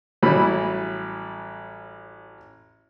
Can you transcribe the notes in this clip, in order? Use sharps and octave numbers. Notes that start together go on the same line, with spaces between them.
A1 F#3 G3 E4 G#5 B5